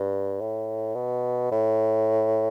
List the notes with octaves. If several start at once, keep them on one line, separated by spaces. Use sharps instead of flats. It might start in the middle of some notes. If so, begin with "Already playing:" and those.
Already playing: G2
A2
B2
A2